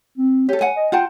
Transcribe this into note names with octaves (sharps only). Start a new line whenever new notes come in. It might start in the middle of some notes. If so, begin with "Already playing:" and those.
C4
G4 A4 C#5
F#5 G#5
D#5
F4 F#5 G5 A5